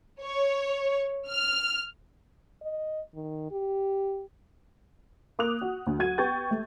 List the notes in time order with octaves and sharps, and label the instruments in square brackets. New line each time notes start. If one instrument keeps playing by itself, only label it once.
[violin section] C#5
F6
[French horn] D#5
D#3
G4
[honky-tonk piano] A#3 D6 D#6 F#6 F7
F#4
D2
F#3 F#4 F#5 G#6 D#7
B3 G4 G5 C#6 G6 A6
A3